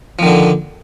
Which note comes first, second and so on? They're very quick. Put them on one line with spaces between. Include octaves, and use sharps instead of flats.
F3 D#3 D3